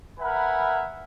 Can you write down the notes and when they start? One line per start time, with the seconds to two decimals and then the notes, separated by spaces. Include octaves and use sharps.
0.19 A#4 B4 E5 F#5 G#5 B5